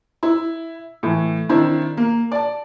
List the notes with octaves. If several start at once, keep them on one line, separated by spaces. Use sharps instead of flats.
E4
A2 E3
D#3 C4 D4 E4
A#3
D5 A5